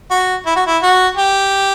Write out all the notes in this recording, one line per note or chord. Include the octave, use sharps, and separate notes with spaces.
F#4
E4
F#4
E4
F#4
G4